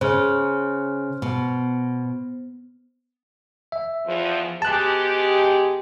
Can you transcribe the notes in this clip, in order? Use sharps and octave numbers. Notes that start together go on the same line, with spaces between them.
C#3 C5 F6
B2
E5
E2 F3
B2 G#3 G4 A5 F#6